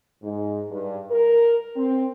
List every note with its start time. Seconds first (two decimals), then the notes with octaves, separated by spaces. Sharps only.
0.22 G#2
0.71 G2
1.10 A#4
1.76 C4